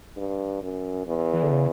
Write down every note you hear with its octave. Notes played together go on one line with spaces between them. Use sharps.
G2
F#2
E2
E3
D3
C#3